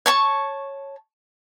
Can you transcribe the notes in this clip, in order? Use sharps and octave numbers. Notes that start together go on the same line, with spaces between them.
C#5 A5 C#6